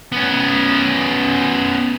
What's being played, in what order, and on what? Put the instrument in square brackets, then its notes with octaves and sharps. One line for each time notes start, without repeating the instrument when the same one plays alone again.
[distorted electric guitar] B3 C#4